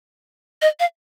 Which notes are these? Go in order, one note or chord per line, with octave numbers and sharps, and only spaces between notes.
D#5
F5